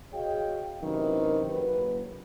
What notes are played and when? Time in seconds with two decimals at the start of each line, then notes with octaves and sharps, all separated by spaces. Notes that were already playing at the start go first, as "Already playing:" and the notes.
0.13 F#4 G#4 C#5 D#5 F5 G5
0.82 F#2 C3 D#3 E3
1.50 F#1 F#3 B4